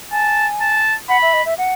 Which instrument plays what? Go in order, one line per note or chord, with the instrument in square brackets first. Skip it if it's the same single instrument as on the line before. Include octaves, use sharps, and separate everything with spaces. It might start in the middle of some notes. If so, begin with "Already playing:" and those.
[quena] G#5 [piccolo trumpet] A5
[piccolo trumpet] A5
[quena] F#5 [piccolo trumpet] B5
[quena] E5
D#5
E5
F#5